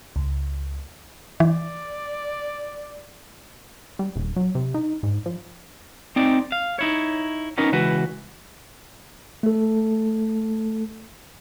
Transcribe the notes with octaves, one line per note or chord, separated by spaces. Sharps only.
C#2
E3 D5
G3
D#1
F#3
C3
D#4
G#2
F3
C4 D#4 D5
F5
D#4 E4 C#5
B3 C#4 D#4 A#4
C#2 E3 F#4 B4
A3 A4